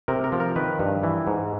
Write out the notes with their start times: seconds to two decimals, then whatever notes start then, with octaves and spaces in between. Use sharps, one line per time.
0.08 C3 A#4
0.24 A#4
0.32 F3
0.40 A#4
0.56 D#3 B4
0.79 G2
1.03 E3
1.27 G#2